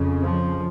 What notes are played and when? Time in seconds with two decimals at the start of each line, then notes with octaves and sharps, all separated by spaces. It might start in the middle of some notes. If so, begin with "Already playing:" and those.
Already playing: F2 C#3
0.23 F3